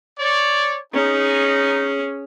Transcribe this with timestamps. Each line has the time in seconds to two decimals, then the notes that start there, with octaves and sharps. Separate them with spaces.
0.19 C#5 D5
0.94 C#4 D#4 G#4